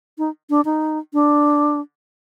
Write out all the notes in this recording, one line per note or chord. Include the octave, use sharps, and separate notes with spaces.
D#4
D4
D#4
D4